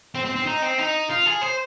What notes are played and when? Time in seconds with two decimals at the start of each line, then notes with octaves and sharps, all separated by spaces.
0.15 C4
0.25 C4
0.36 C4
0.46 D#4
0.62 C4
0.78 D#4
1.10 F4
1.26 G#4
1.42 C5